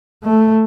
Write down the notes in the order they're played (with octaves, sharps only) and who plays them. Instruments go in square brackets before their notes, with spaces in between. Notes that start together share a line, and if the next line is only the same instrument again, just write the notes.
[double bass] A3